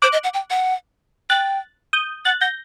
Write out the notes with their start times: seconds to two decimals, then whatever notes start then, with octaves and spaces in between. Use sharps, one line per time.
0.02 C5 D6 F#6
0.13 D#5
0.24 F#5
0.34 G5
0.50 F#5
1.30 G5 F#6 A6
1.93 D#6 G6
2.25 F#5 F#6 A6
2.41 F#5 G6 A#6